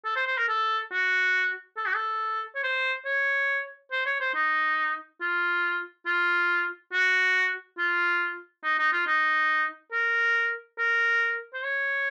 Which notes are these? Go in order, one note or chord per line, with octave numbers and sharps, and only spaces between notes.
A4
C5
C5
A#4
A4
F#4
A4
F#4
A4
C#5
C5
C#5
C5
C#5
C5
D#4
F4
F4
F#4
F4
D#4
D#4
F4
D#4
A#4
A#4
C5
C#5